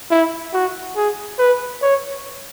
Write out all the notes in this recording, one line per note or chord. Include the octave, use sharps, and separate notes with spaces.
E4
F#4
G#4
B4
C#5